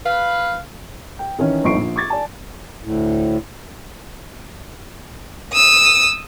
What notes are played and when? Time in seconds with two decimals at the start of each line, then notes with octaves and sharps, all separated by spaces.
0.05 B4 F5
1.19 G5
1.39 D#3 E3 C#4
1.64 G1 F2 D#4 C#6 C7 D7
1.76 A#1
1.96 C#6 D6 G#6 A6
2.10 D5 G#5 A5
2.83 D2 A2
5.53 D#6 E6